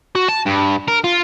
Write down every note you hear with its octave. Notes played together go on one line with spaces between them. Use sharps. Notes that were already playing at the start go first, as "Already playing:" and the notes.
F#4
A5
G2
A#4
F4